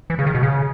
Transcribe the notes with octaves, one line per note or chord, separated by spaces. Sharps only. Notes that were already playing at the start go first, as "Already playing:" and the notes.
E3
C#3
D#3
B2
C#3